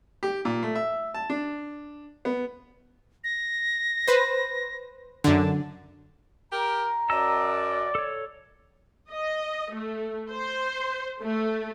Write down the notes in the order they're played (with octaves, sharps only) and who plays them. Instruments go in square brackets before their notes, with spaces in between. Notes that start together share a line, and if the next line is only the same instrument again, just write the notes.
[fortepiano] G4
A#2
A3
E5
A5
D4
B3
[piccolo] A#6
[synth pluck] B4 C5
[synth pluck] F#2 D3 [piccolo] A5
[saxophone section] G4 A#4 [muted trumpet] A#5
[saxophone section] F#2 [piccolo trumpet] D5 [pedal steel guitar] D#5 A5 E6
[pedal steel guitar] A4 C#5
[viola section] D#5
A3
C5
A3